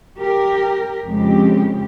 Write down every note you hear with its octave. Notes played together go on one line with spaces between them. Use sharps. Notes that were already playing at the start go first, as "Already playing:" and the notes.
G4 A#4
F2 C#3 G#3 G4